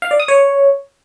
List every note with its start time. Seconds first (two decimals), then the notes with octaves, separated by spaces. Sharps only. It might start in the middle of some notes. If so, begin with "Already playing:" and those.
0.02 F5
0.11 D5
0.20 D#6
0.28 C#5